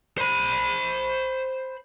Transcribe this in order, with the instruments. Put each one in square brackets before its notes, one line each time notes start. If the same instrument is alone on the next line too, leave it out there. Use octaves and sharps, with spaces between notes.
[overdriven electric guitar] C5 B5